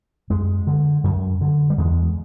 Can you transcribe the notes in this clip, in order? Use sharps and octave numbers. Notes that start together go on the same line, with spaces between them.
F#2 G#3
D3
F#2
D3
G3
E2 G#3